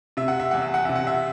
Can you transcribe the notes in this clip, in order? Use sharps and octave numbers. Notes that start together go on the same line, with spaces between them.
C3 E5
F#5
E5
E2 F#5
E5
F#5
C3 E5
F#5
E5